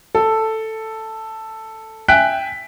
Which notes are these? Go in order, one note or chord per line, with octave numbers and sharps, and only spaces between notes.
A4
E5 G5 G#5 F#6 B6 D7